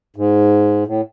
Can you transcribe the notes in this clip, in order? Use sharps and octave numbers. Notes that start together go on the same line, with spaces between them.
G#2
A2